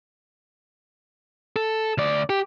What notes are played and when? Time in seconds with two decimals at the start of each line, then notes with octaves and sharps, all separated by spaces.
1.56 A4
1.98 D2 D5
2.30 G4